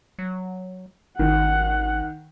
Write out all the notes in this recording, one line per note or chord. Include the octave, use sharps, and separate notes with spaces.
F#3
G#1 D#3 F#5